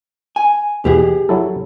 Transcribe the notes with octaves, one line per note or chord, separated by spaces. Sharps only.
G#5
E2 B2 G4 G#4
F#3 E4 A4